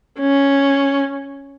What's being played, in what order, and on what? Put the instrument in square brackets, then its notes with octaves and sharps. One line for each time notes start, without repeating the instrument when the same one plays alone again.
[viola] C#4